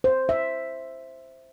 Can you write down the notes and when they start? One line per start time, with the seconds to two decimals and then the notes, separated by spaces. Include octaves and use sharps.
0.04 C5
0.29 E5